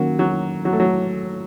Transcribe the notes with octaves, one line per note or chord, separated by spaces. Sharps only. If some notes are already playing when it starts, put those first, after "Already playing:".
Already playing: D#3 F#3 A#3 C#4 F#4 A#4
F#3
F#3
A3
F#3